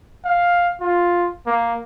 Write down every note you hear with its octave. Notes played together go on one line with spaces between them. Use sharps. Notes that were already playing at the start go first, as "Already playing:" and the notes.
F5
F4
A#3